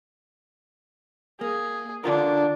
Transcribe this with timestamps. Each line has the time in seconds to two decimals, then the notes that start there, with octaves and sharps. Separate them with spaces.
1.41 A#3 G#4
2.04 D3 D4 F4 A#4